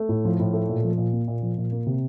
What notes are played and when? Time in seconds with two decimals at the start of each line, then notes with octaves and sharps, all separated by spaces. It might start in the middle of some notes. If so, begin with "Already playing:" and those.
Already playing: A3
0.09 A2
0.25 F3
0.40 A2
0.53 A3
0.68 A#2
0.84 F3
0.98 A#2
1.13 A#3
1.28 A#2
1.42 F3
1.58 A#2
1.72 A#3
1.87 C3